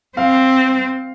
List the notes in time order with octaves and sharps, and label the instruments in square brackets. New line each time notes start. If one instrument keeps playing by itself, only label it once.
[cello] C4 [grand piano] F5